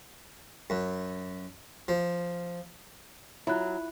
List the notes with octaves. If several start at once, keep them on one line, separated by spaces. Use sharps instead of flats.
F#2
F3
F#3 E4 F4 E5 B5 F#6